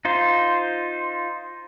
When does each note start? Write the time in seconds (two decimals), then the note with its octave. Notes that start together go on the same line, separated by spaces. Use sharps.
0.05 D#4 F4 C5